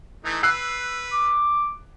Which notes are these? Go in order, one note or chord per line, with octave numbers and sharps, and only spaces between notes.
E3 A3 D#4
B4 E6 F#6 C7
D6